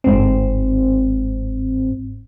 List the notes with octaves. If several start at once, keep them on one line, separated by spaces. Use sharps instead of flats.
G1 G#2 C4